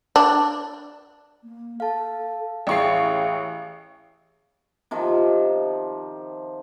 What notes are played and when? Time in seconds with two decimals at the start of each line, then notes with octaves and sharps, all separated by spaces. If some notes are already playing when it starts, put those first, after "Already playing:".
0.16 D4
1.43 A#3
1.80 A4 F5 A5
2.67 A1 G#4 E5 F5 G5 C#6 C7
4.91 C3 D#3 F3